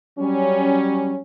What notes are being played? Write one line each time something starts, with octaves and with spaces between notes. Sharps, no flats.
F#3 G3 C#4